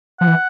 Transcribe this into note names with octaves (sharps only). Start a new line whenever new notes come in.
F3 F#5
E3